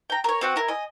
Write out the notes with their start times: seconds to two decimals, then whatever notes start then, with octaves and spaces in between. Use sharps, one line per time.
0.10 G5 A#5
0.24 A#4 C#5
0.41 C4 F#4 F#5
0.56 E4 A#4
0.68 D#5 G#5